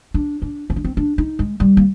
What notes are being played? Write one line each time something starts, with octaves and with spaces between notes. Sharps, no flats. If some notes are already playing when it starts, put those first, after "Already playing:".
D4
D4
C4
D4
C4
D4
D#4
G#3
G3
A#3